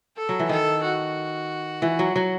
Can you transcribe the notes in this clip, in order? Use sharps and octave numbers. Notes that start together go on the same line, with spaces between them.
A4
F#3
E3
D#3 A4
F#4
E3
F#3
F#3